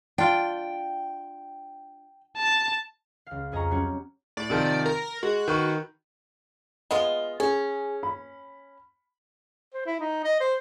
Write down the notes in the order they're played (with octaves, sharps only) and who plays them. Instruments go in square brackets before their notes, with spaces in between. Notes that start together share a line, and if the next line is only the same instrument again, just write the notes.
[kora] D4 F4 [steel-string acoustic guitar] G5
[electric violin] A5
[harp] C#2 F5
F2 G#4 D#5 G#5 A#5 C#6
F#3 G3 C4 C#4 F#4 C#5
[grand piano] A2 [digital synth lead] D5
[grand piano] C3 D#3 F3
[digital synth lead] A#4 [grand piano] A#5
[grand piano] G#3 [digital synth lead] F#4
[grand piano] D#3 B4 C#6
[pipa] G#3 B3 F4 [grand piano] D#5
[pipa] C#4 [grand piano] G#4
[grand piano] B5
[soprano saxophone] C5
E4
D#4
D#5
C5